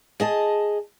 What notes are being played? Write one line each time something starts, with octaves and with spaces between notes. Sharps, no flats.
G#4 D#5 A5